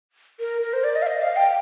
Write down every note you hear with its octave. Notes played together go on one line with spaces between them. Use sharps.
A#4
A#4
C5
D5
D#5
F5
D#5
F5
G5